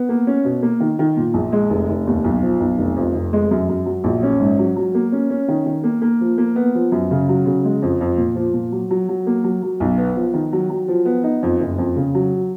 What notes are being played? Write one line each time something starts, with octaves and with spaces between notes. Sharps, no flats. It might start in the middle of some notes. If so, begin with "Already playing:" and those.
Already playing: B3
A#3
C#4
B2
A#3
D#3
D#3
A#2
A#1
G#3
F1
F1
D#2
B1
F3
B1
F1
F2
F1
G#3
F#2
F#2
F#3
A#1
C#4
G#2
F#3
F#3
A#3
C#4
C#4
D#3
D#3
A#3
A#3
F3
A#3
B3
F3
F#2
C#3
F#3
C#3
G#3
F2
F2
A#2
F3
A#2
F#3
F#3
F#3
A#3
F#3
F#3
B1
B3
F3
D#3
F#3
F#3
F3
B3
D#4
F2
F#1
F2
C#3
F#3